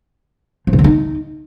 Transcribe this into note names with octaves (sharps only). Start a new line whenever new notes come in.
F3
C3
D3
D#4